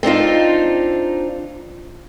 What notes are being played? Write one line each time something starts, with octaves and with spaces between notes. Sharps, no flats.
C4 D4 D#4 F4